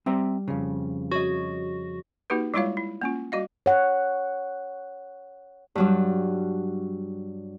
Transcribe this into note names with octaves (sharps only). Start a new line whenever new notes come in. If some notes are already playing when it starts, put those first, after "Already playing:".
G3 C4 E5 A#5
F2 C#3
F#4 C#5 D#5
A#3 D#4 F#4 G4 B4
G3 G#3 E4 F4 C#5 F5
E4
A#3 C#4 F4
G3 F#4 D#5 F5
C#5 F#5
G2 F#3 G3